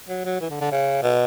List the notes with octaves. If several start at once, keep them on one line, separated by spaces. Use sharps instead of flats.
F#3
F#3
E3
D3
D3
C#3
B2